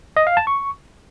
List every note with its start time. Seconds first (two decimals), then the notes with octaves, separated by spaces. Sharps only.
0.17 D#5
0.27 F5
0.37 A5
0.47 C#6